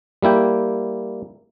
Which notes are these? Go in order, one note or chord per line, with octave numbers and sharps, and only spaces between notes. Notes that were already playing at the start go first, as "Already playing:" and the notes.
G3 A#3 E4 G5